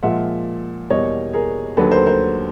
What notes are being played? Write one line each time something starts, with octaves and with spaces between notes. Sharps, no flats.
A#2 F3 G#3 E5 F#5
E2 B2 G3 A#3 C#5 D#5
G#4 A#4
D#2 D3 F#3 A3 A4 B4
A#4 C5
A#4 C5